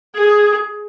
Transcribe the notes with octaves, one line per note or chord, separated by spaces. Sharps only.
G#4